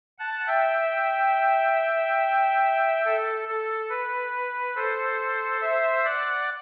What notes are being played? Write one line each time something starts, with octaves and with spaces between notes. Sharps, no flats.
F#5 A5
E5 G5
A4
A4
B4
A4 C5
C5 E5
D5 F#5